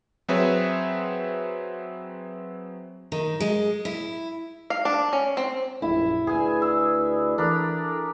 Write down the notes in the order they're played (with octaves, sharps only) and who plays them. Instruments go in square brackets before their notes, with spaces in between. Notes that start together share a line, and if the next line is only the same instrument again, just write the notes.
[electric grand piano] F#3 C4 G#4 B4 C#5 E5
[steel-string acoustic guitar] D#3
G#3
E4
[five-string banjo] F5
D4
C#4
C4
[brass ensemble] A#1 F#2 [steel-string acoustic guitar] E4
[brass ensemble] D2 B4 D5 [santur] G#4 G#5
[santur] E6
[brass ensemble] E3 A4 [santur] D4 A#4 B5